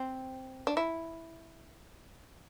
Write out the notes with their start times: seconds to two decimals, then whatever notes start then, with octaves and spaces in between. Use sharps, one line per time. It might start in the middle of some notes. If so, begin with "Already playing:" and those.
Already playing: C4
0.67 D4
0.77 E4